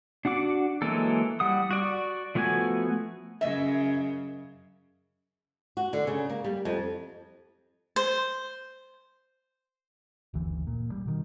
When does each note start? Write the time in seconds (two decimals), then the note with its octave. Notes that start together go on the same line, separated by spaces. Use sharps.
0.25 D4 F#4 F#5 D6
0.82 E3 F#3 G#3 A#3 A4
1.40 G3 F#5 D#6
1.71 F#4 D5 C#6
2.35 F3 A3 B3 F#4 G#5
3.41 F#2 C#3 D#5 E5
5.77 F#4
5.93 D3
6.07 C#3
6.30 A#3
6.44 G3
6.65 F2
7.96 C5
10.34 F#1 D2 E3
10.67 A#2
10.92 G3
11.06 B2 D#3